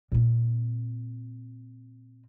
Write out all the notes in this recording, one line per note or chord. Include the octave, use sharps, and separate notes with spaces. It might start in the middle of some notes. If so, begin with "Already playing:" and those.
A#2 C4